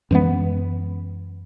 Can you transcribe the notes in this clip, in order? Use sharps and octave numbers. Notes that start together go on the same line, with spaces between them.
F#2 E3 G#3 B3